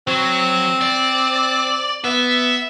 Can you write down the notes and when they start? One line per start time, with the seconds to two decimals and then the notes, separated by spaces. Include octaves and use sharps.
0.08 F#3 C4
0.82 D5
2.04 B3 E5